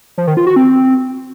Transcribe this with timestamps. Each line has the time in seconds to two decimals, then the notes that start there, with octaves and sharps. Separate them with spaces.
0.18 F3
0.27 D#3
0.37 F4
0.47 F#4
0.56 C4